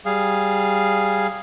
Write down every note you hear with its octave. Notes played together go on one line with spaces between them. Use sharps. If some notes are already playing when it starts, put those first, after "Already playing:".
G3 G#4 F5